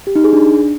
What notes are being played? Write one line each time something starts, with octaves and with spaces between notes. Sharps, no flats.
G4
D#4
G#4
D4